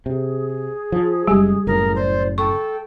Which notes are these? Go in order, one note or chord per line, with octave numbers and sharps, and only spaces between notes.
C3 G#4
F3
F#1 G3 G#3 G4 G#5
F#1 A2 A#4
C5 D5
A4 G5 C#6